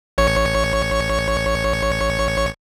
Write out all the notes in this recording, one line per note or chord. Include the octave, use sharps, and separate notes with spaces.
A1 C#5 C#6